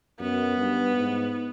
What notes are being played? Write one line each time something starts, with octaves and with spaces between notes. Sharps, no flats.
F#2 B3
G2
G#2